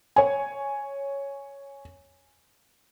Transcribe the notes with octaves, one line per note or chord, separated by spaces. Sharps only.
C#5 G#5